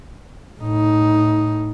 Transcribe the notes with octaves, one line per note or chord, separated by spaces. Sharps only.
A2 D#4